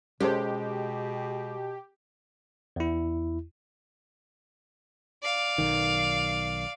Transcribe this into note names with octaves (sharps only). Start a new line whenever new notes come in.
B2 G#3 C#4 G4 A4 C5
E2 E4
D5 F5
B1 D#3